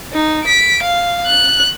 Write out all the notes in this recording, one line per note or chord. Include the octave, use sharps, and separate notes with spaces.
D#4
B6 D7
F5
F#6